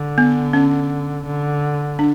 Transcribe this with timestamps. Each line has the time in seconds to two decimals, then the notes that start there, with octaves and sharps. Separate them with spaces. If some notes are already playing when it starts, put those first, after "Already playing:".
Already playing: D3
0.18 B3
0.53 C#4
1.26 D3
1.99 D4